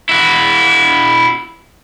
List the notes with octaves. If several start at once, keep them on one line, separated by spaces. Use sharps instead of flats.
E4 F#4